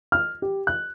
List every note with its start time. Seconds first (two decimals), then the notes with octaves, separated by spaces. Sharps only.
0.12 F6
0.42 G4
0.67 F#6